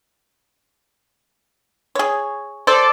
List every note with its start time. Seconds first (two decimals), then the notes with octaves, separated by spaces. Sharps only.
1.95 G#4 C#5
2.67 A4 C5 D5